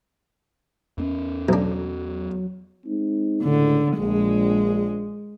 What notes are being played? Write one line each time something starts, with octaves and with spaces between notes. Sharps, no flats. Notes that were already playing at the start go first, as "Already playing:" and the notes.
E2 C4 C#4
B1 F#3 D4
G#3 C4 D#4
C#2 A2 D3
A#1 G#3